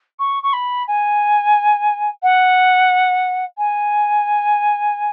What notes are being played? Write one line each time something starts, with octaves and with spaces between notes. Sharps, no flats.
C#6
C#6
B5
G#5
F#5
G#5